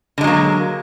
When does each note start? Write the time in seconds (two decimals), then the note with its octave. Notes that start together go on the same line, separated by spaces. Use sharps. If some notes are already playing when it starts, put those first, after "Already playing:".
0.18 D3
0.21 G#3
0.24 F#3
0.27 A#3